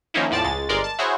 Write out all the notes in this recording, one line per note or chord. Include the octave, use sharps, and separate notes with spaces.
D#3 F3 A#3 C#4 D#4 E4
E2 A2 F3 D5 A5 A6
C#2 G#3 A6
G1 G#3 A#4 D5 C6
A5
E4 F#4 G#4 C5 C#5 C#6